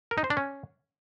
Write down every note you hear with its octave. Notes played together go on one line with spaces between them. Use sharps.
A#4
D#4
C5
D4
C#4